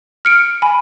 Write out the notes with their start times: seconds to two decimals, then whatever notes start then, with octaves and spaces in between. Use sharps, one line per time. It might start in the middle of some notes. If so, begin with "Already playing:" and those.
0.25 F6 C#7 D7
0.62 G#5 B5